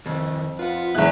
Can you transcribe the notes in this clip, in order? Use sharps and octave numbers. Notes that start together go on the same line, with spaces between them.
F2 D#3 E3
F4 B4 F#5
G#1 B3 E4 G#4 F#6